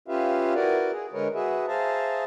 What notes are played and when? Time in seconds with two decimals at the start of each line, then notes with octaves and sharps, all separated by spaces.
0.08 C#4 F4 G4 B4 E5 F5
0.54 E4 F#4 A#4 B4 D5
0.92 G#4
1.13 D3 G#3 A#4 B4 C#5
1.34 F#4 G#4 B4 E5
1.68 G#4 C5 E5 F5 A5 A#5